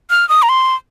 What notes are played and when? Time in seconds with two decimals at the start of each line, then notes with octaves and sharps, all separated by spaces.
0.10 F6
0.29 D#6
0.42 A#5
0.49 C6